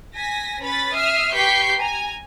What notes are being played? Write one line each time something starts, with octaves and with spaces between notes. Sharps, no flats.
G#5 A#6 B6
C#4 B4 B5 A6 B6
E5 D#6 F6 C7
G4 B4 C#6 G6 B6 C7
G#5 A#5